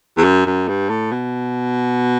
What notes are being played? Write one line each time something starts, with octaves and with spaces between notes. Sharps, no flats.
E2
F#2
F#2
G2
A2
B2